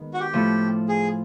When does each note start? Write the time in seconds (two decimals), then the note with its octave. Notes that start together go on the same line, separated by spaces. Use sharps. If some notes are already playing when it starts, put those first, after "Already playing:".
Already playing: D#3 G#3 B3
0.14 F#4
0.20 G4
0.33 A2 F3 A3
0.89 G#4